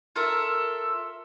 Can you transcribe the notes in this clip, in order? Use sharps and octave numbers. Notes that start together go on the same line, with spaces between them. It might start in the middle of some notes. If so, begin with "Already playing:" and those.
F4 A4 A#4 E5